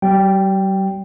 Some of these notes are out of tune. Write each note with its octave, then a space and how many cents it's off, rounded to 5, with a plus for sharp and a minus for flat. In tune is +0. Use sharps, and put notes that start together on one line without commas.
G3 -40 G5 +0